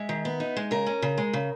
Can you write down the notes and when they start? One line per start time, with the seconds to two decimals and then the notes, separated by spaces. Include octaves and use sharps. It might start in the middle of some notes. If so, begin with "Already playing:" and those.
Already playing: G#3 E5
0.09 D#3
0.25 B3
0.40 D#4
0.56 G#3
0.71 C#3 A#4
0.86 C#4
1.02 C#3
1.18 G#3
1.33 C#3